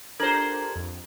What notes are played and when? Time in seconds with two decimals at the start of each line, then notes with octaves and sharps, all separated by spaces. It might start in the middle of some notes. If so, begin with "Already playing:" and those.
0.20 D4 F4 G4 A4 A#4 C5 G#6 F#7
0.75 F2